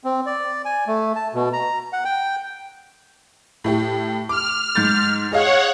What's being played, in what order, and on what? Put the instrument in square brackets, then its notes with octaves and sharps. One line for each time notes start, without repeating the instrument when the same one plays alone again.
[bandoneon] C4
D5
G#5
A3
A5
B2
A#5
F#5
G5
[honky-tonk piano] A2 E4 G4
[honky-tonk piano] D6 [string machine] F6
[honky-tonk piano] G#2 G6 A6
[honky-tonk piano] G#4 D#5 F5 [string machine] C#5 F#5